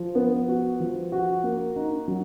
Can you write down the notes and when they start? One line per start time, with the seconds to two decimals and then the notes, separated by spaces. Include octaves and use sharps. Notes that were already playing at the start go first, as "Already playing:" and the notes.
Already playing: F3
0.15 B3
0.48 F#4
0.80 F3
1.12 F#4
1.44 A#3
1.76 D#4
2.08 F#3